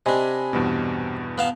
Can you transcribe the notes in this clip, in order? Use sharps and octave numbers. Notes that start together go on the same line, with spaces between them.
C3 D4 D#5 G#5 B5
E2 G2 B2
B3 F5 A5